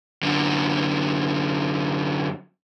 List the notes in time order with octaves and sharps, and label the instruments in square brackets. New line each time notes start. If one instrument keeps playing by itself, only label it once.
[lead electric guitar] F#2 D3